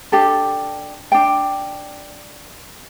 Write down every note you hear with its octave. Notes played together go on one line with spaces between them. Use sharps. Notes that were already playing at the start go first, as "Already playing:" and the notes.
D4 G4 A4
D4 G5